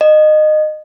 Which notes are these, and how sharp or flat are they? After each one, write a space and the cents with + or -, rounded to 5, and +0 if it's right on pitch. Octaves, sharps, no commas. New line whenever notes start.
D#5 -20